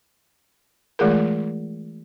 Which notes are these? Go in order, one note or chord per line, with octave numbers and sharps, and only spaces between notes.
E3 G#3 A3 F4 G#4 A#4